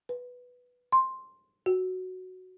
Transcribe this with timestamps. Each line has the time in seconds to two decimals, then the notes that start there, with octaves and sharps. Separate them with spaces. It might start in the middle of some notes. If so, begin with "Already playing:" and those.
0.09 B4
0.92 C6
1.66 F#4